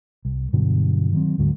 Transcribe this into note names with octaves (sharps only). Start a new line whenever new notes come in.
C2
G2 B2 D3 F#3
D#3 F#3 C4
D2 G#2 D3 F#3